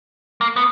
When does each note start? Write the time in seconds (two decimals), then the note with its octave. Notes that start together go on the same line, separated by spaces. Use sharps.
0.41 A#3
0.56 B3